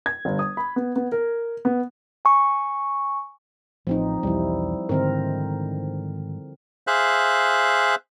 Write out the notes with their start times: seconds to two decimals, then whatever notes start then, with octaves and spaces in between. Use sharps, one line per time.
0.06 G#6
0.25 G1
0.39 D#6
0.57 B5
0.76 B3
0.96 B3
1.12 A#4
1.65 B3
2.25 G#5 C#6
3.87 A1 F3 C4 D#4
4.23 B1 E2 G3 E4
4.89 G#2 D3 D#3 C4 A#4
6.87 G#4 C5 E5 F5 F#6